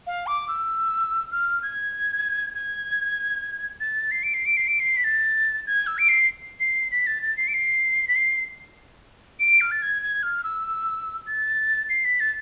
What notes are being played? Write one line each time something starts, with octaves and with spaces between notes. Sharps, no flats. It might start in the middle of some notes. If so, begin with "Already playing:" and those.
F5
D6
E6
F6
G#6
G#6
A6
C7
D7
C7
D7
C7
D7
C7
B6
A6
G#6
E6
D7
C7
C7
B6
A6
A6
C7
D7
C7
B6
C7
D7
F6
A6
G#6
G#6
F6
E6
A6
C7
B6
A6